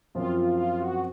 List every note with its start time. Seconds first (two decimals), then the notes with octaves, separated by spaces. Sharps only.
0.15 F#2 F3 C4 F4
0.36 F4
0.57 F4
0.79 F#4